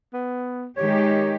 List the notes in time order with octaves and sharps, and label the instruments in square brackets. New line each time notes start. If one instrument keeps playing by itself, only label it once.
[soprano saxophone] B3
[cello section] D#3 G#3 G4 [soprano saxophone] C#5